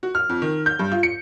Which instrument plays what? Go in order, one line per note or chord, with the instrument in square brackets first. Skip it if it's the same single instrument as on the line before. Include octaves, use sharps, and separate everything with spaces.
[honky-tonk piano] F#4
F6
F2
D#3
G6
G2
F4
C#7